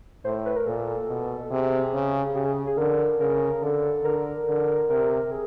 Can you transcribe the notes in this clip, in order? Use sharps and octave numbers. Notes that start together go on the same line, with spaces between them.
A2 C5
B4
A#4
A#2 A4
B2
C3 G#4
C#3
C#3 G4
G#4
G#4
D3 A#4
C#3 A#4
D3 A4
D3 A#4
D3
C3 A#4
G#4